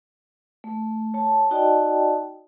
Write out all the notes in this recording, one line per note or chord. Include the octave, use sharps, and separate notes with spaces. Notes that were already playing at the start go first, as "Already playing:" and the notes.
A3
C#5 A5
D#4 F#4 D5 D#5 G5 A5